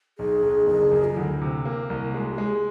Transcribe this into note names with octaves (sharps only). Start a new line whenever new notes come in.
B1 G#4
B1
F#1 G#4
F#2
F4
D2 E4
C3
A#3
C2
G#3 F#4
G4
G#3
G#4